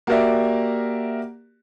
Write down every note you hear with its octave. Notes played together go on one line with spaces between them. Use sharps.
A#3 F#4 G4 A#4 D5 E5